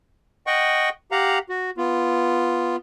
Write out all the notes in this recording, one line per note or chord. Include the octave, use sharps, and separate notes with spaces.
D#5 F#5 G5 C#6
G4 F5 F#5 A#5
F#4
B3 F4